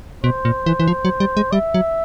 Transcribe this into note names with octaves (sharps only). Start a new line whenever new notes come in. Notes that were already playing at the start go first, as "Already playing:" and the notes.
B2 C5
A#2
E3
E3
F3
F#3
G3
G#3
G3 E5
F#3